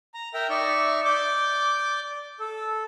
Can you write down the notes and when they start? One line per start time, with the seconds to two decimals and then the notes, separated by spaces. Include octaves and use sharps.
0.14 A#5
0.34 A#4 E5 G5 A#5
0.50 D#4 D5 E5 C#6
1.05 D5 D6 G6
2.40 A4